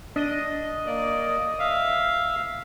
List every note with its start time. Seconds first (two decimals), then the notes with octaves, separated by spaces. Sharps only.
0.16 D4 D#5
0.86 A#3 D5
1.59 E5 F5